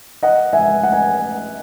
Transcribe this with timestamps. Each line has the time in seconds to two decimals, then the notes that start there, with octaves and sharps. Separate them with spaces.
0.23 D#5 F#5
0.53 E5 G#5
0.83 F#5
0.92 G#5